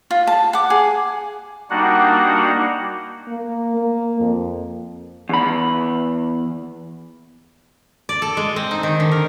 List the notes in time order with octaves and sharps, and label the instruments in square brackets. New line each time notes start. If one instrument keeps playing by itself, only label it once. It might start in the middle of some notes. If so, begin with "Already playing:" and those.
[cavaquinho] F4
A5
F#5 D6
G#4
[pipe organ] G3 A#3 D4 D#4 F#4 F#5
[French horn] A#3
A#3
F2
[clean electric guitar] E2 B5
[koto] D5
A4
G#3
C4
D#4
D#3
D3
A#4